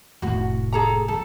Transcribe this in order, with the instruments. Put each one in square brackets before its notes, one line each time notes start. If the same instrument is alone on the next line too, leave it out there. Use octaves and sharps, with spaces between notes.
[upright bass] F1 A2 [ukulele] F#4
[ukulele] G#4 A4 A#5
[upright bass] F#3 [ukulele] A4